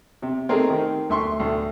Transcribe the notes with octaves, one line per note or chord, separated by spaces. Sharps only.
C3
A3 C4 D#4 G4 G#4 A#4
D#3
D2 E5 C6 C#6
D2 A2